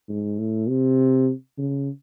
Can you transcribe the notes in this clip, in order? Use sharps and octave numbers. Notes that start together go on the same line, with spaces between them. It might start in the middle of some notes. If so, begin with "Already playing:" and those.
G#2
A2
C3
C#3